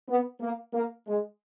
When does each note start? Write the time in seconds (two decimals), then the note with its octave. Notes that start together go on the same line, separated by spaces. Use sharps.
0.09 B3
0.41 A#3
0.74 A#3
1.07 G#3